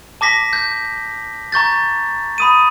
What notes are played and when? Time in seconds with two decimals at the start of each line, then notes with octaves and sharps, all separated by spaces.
0.21 A5 D6 A#6 B6
0.53 G6
1.52 A#5 C#6 G6 A6
2.38 B5 D#6 D#7